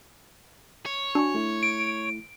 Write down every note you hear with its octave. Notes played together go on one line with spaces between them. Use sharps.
C#5
D4 F#4 G#5 C#6
A3 E4
D7